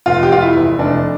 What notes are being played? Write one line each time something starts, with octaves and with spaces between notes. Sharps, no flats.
F1 F4
G4
F1 F4
E4
E2
F1 D4